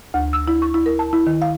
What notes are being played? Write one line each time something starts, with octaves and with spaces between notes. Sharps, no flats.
D2
E6
E4
C#6
E4
A#4
A5
E4
D#3
F5